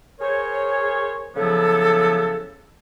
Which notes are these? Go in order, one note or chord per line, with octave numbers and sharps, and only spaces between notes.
G#4 A#4 C5 C#5
C#3 F3 F#3 B3 E4 A4